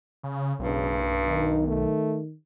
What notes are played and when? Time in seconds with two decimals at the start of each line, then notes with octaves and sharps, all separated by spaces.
0.23 C#3
0.59 E1 B1 G2 C#3
0.90 F#1
1.28 D#3 D#4
1.68 A3